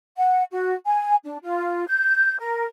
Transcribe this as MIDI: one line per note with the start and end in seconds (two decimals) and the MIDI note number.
0.17 0.44 78
0.52 0.73 66
0.86 1.15 80
1.24 1.38 62
1.43 1.84 65
1.87 2.35 91
2.39 2.64 70